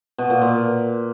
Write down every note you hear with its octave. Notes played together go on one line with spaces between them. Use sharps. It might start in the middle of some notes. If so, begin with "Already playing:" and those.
B2
A#2
A#2